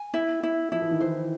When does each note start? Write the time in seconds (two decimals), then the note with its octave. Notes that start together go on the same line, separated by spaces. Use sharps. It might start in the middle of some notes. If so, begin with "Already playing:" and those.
Already playing: G#5
0.14 E4
0.43 E4
0.72 F3 E4
0.82 E3
0.91 D#3
1.00 E3 C5